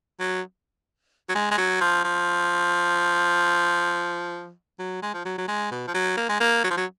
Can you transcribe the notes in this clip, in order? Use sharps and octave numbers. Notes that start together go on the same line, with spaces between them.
F#3
F#3
G#3
G#3
F#3
F3
F3
F#3
G#3
F3
F#3
F#3
G#3
B2
F3
F#3
A#3
G#3
A#3
F#3
F3
F#3